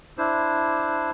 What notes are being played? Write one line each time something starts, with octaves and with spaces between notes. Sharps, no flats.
D4 E4 C5